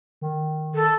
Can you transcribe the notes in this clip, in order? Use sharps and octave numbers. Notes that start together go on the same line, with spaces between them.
D#3
A4